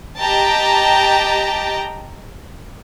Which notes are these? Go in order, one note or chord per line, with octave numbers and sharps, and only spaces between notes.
G4 D#5 G5 A5 A#5